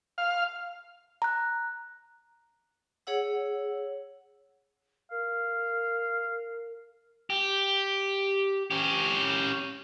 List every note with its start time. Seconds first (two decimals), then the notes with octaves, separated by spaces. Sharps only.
0.18 F5
1.22 A#5 F#6
3.07 G#4 C#5 F#5 E6
5.11 A#4 F5
7.30 G4
8.71 C#4 G4